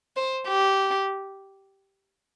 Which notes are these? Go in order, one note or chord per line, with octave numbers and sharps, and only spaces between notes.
C5
G4